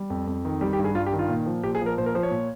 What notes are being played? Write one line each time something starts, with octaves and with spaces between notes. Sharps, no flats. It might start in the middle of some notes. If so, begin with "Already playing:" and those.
Already playing: G3
F2
F2
D#3
G3 G4
G4
G2
G#4
G2 F4
G4
D#3
F4
A#2
F3
A#2 G4
G#4
F3
A#4
A#2 C5
A#4
F3 C5
C#5
A#2